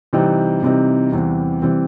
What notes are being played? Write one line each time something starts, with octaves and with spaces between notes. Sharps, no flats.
C3 E3 G3 C4 D#4
C3 E3 G3 C4 D#4
E2 C3 E3 G3 C4
C3 E3 G3 C4